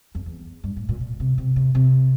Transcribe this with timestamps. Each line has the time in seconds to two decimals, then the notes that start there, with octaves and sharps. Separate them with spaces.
0.15 F2
0.26 E2
0.64 G2
0.76 A2
0.89 A#2
1.00 A#2
1.20 C3
1.38 C3
1.56 C3
1.75 C3